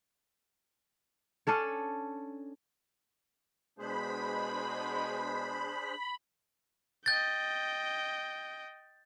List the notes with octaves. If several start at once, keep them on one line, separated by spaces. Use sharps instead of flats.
C#4 D4 A4 C#5
B2 G#3 D4 G#4 C5 B5
D#5 G5 G6 A6